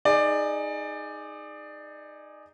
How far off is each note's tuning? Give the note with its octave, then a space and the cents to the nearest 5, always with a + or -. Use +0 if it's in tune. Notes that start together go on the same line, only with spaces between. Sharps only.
D#4 +0 G#4 +0 D5 +20